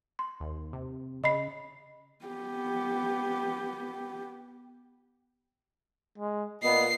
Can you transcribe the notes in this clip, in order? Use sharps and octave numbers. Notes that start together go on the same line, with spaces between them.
C6
D#2
C3
C#3 D#5 B5 C7
B3 G4
G#3
A#2 B3 D#5 C7